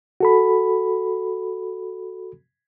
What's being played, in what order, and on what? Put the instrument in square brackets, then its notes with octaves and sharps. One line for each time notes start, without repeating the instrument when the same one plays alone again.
[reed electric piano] F#4 A4 B5